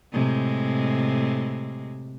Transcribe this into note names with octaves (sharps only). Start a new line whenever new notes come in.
A2 C3 G#3